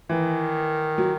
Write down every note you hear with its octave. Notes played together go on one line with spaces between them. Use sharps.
D#3 E3
F#3